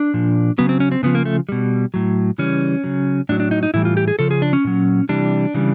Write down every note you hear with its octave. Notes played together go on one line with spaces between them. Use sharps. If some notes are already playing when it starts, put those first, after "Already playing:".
Already playing: D4
A#2 F3
C#3 F#3 B3
C4
C#4
C4
C#3 F3 B3
A#3
A3
B2 G3
A2 F#3
C#3 E3 G3 C#4
C#3 F#3
A2 F#3 D4
D4
D#4
D#4
A2 E3 G3 E4
F4
G4
G#4
C#3 F3 A4
G#4
D4
C#4
A#2 F#3
C3 E3 G3 D4
C#3 E3 G3